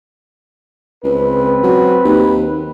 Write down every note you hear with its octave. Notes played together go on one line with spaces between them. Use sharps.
C#2 C4 B4
F#3
D#2